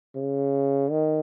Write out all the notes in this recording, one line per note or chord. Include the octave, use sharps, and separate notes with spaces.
C#3
D#3